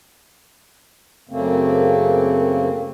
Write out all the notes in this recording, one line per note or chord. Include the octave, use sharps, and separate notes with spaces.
F#2 C#3 A3 A#3 C4